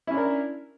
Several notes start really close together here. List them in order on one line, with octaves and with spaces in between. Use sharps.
E4 C#4 D4 A#4